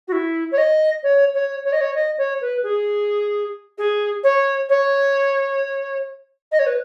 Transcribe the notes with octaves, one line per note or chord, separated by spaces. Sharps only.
F#4
E4
C#5
D#5
C#5
C#5
C#5
D#5
C#5
D#5
C#5
B4
G#4
G#4
C#5
C#5
D#5
C#5
B4